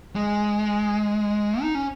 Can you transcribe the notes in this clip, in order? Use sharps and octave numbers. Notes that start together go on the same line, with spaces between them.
G#3
D#4
C#4